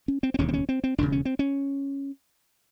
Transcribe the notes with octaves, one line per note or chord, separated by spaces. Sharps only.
C#4
C4
C4
E1 D#2 C#3 C#4
C4
C#4
C4
C4
E1 D#2 C#3 D4
C#4
C4
C#4